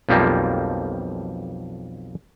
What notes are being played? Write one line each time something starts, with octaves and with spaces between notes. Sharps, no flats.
B1 F2 F3 G3 A#3